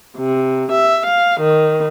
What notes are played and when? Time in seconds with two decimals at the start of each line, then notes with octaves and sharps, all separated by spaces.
0.17 C3
0.71 E5
1.06 F5
1.40 D#3